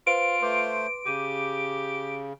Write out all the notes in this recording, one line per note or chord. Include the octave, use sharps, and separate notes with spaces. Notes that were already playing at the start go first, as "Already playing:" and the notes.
F4 B4 C5 F5 D7
A3 B4 C5 C6 D6
C#3 G4 D6 G6 D#7